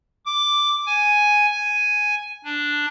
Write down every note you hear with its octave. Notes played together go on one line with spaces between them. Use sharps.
D6
G#5
G#5
D4